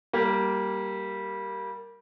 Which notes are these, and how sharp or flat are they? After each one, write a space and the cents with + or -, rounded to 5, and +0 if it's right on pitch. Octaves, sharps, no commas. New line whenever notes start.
G3 -10 A#3 +0